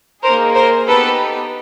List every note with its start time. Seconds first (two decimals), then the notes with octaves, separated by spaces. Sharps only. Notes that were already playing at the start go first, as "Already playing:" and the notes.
0.22 A#3 D#4 G#4 A#4 C5
0.55 A#4 C5
0.87 B3 D#4 G4 A4 B4